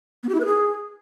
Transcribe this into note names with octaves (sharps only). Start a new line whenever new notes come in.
B3
G4
E4
B4
G#4